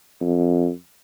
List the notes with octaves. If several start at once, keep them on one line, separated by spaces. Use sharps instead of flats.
F2